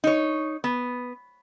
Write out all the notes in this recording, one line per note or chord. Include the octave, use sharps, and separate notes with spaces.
D#4 C#5
B3